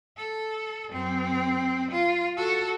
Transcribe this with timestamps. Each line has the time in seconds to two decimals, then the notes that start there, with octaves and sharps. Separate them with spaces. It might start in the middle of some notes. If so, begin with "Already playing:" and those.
0.17 A4
0.90 F#2 C4
1.91 F4
2.37 F#4 A4